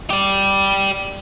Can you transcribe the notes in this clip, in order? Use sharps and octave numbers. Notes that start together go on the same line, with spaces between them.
G4 D5